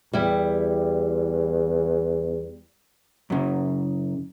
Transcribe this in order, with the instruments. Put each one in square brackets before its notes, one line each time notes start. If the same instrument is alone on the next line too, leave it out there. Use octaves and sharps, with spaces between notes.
[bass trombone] E2 [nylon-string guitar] G3 E4 G4
[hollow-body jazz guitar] F#2 C#3